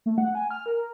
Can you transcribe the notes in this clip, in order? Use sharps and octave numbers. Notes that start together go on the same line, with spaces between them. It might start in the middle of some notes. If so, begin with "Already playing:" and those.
A3
F#5
G#5
F6
A#4